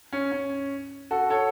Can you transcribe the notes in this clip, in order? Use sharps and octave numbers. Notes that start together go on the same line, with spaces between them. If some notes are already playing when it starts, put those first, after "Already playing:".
C#4
C#4
F#4 A4
A4 C#5